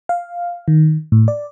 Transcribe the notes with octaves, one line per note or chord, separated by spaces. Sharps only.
F5
D#3
A2
D5